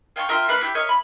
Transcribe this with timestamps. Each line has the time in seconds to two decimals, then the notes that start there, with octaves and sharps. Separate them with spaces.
0.16 F5 G5 G#5 C#6
0.29 F4 A#4 E5 G5
0.49 A#3 B4 F#5
0.61 E4 G4 G6
0.75 A#4 C#5 D#5 E5
0.89 B5